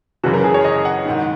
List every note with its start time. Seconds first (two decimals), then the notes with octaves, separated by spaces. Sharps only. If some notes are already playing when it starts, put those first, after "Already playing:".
0.24 F#2 C#3 E3 F#4
0.34 A#4
0.44 G#4
0.54 C#5
0.64 D#5
0.85 F#5
1.05 G#2 D#3